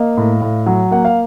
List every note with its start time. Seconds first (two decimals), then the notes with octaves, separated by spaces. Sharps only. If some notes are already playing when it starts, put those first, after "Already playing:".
Already playing: A#3 D#5 F5
0.17 A2
0.42 A2
0.66 F#3
0.91 A#3 F#5
1.05 F5